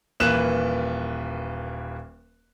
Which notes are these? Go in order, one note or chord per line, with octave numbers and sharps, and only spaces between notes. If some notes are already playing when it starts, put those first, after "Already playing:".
D#1 E3 A#3 B4 F#6 E7